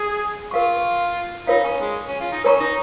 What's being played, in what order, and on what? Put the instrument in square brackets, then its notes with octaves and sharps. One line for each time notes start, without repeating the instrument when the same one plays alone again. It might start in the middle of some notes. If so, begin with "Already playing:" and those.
Already playing: [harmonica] G#4
[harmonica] F4 [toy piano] A#4 F5 C#6
[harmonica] D#4 [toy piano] F4 A#4 C#5 F5
[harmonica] C#4
G#3
C#4
F4
D#4
[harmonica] C#4 [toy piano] A#4 C#5 A#5 C#6
[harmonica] D#4